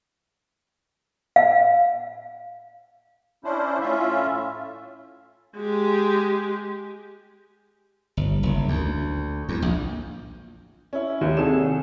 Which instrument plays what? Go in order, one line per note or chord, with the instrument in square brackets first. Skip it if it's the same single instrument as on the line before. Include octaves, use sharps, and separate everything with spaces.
[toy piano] F5
[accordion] C#4 D4 E4 C5
A2 C#4 F4 E5
[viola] G#3 G4
[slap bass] G1
F#1
D2
E2
A#1
[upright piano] C#4 E4
D#2 D#3
C2 C3 G#4 A4 C#5 E7